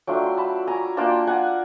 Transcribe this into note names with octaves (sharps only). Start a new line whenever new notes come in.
F#3 A3 D4 F4 G5 A5
C6
A5 B5
G#5 A#5
A#3 D4 F4 G5 A5
F#5 G#5